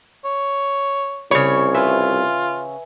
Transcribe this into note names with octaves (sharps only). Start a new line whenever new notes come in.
C#5
C2 C#3 C#5 B5
F4 B4 E5 G#5